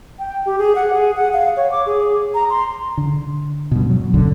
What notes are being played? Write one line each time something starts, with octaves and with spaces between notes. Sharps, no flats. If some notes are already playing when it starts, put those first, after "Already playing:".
G5
G4
G#4
F#5
G#4
F#5
F5
C#5
D6
G#4
A#5
C6
D3
G2 B2
F#3
A#1 F#2 D3